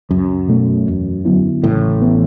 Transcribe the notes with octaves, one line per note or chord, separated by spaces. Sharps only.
C#2 F#2
B2 A3
E2
D3 F#3 B3 E4
A1 A2 C#3
E3 B3